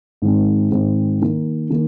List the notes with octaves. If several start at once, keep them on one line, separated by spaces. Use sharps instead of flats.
G#2 D#3 G#3 C4
G#2 D#3 G#3 C4
D#3 A#3 D#4
D#3 A#3